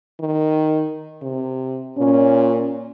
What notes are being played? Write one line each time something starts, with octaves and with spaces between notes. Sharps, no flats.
D#3
C3
A#2 C#4